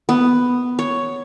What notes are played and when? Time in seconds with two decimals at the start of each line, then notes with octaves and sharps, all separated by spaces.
0.09 B3
0.79 C#5